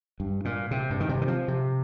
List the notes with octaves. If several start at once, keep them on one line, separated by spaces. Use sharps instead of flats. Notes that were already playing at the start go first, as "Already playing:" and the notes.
G2
A#2
C3
G2
D#3
C3
D#3
F3
C3